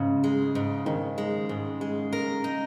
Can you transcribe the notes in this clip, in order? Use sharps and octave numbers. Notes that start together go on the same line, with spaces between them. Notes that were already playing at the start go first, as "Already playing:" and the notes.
Already playing: G#2 C#3
G#3
G#2
G#2 D#3
G#3
G#2
G#3
A#4
D#4